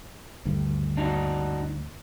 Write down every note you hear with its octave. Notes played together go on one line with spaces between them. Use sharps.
D2 G2 D#3
D4 D#4 F#4